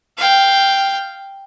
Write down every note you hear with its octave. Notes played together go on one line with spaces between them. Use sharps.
F5 G5